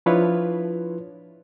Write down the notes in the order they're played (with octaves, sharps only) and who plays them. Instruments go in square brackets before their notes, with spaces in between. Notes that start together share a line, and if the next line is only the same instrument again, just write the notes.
[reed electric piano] F3 D4 E4 F4 B4 C#5